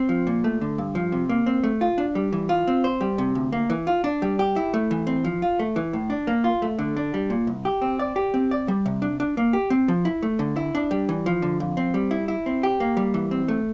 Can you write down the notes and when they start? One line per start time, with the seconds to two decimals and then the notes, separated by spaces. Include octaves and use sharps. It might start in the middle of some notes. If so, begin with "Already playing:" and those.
Already playing: C4
0.09 F3
0.27 A#2
0.44 A3
0.61 D3
0.78 G2
0.95 F3
1.12 C3
1.29 A#3
1.46 C4
1.63 A3
1.81 F4
1.98 D4
2.15 G3
2.32 E3
2.49 F4
2.67 C4
2.84 C5
3.01 G3
3.18 C3
3.35 D2
3.52 A#3
3.70 E3
3.87 F4
4.04 D4
4.22 G3
4.39 G4
4.56 E4
4.74 A3
4.91 E3
5.07 C4
5.24 F3
5.42 F4
5.59 A3
5.76 E3
5.93 A2
6.10 D4
6.27 A#3
6.44 F4
6.62 A3
6.79 D3
6.97 D4
7.14 G3
7.30 A#2
7.47 C2
7.65 G4
7.82 C4
7.99 D5
8.16 G4
8.34 C4
8.51 D5
8.68 G3
8.86 C3
9.02 D4
9.20 D4
9.37 A#3
9.53 G4
9.70 C4
9.88 F3
10.05 E4
10.23 A3
10.39 D3
10.56 E4
10.75 D4
10.91 G3
11.09 E3
11.26 F3
11.42 D3
11.60 F2
11.77 C4
11.94 G3
12.11 E4
12.28 E4
12.46 C4
12.63 G4
12.80 A#3
12.97 G3
13.14 E3
13.31 C4
13.48 A3